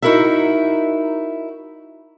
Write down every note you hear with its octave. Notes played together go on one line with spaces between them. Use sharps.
D#4 E4 F#4 A#4 E5